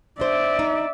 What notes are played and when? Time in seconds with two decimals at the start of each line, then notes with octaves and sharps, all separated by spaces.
0.20 D4 C5 D5 E5
0.59 D#4